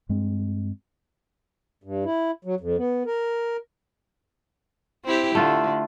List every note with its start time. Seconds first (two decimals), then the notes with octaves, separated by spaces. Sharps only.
0.09 G2 G#3 C4
1.84 G2
2.05 E4
2.45 F#3
2.61 F2
2.78 B3
3.06 A#4
5.05 C4 E4 G4
5.35 D3 A3 F4